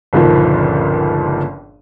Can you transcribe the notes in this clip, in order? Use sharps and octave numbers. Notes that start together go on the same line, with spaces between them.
G1 C#2 A#2 D#3 F3